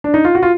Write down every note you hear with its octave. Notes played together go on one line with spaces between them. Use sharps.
D4
D#4
F4
F#4
F4